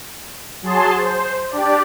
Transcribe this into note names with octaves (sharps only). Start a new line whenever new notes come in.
F#3 G#4 A5 C6
C5
D4 G4 D5